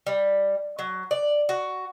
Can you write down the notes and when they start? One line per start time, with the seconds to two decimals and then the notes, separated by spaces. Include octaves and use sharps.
0.07 G3
0.79 F#3
1.11 D5
1.49 F#4